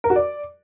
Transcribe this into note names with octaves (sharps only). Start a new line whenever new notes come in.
A#4
F#4
D5